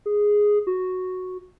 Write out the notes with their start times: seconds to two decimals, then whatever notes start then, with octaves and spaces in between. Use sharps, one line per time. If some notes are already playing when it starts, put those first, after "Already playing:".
0.06 G#4
0.67 F#4